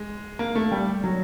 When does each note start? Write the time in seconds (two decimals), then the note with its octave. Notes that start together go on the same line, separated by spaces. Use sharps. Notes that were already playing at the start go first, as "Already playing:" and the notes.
Already playing: G#3
0.39 A#3
0.55 A3
0.72 G3
1.04 F#3